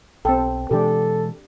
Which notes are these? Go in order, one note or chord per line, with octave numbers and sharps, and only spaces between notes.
B1 C4 A4 G5
B2 E3 G#3 D4 G4 A4